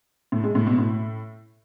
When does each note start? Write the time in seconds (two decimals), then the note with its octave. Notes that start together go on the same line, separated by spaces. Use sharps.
0.32 A2
0.44 G#3
0.55 A2
0.67 B2
0.78 A2